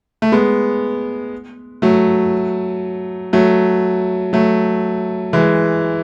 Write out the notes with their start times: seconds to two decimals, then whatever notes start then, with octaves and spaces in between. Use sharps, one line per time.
0.22 A3
0.32 G#3 B3
1.82 F#3 A3
3.33 F#3 A3
4.33 F#3 A3
5.33 E3 G#3